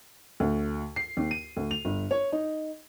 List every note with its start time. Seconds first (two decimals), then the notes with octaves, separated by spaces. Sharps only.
0.40 D2
0.96 C7
1.17 D#2
1.31 D#7
1.57 D2
1.71 F7
1.85 G1
2.11 C#5
2.32 D#4